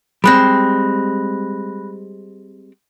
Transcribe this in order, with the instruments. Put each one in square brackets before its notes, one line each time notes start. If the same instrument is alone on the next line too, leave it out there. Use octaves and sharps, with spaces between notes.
[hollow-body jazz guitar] G3 G#3 C4 [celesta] B5 F#6 A#6